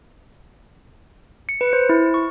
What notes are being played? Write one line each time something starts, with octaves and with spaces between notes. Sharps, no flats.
C#7
B4
C5
E4
C#6